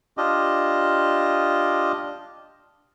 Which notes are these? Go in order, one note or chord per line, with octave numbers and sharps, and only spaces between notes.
D4 F4 G4 D#5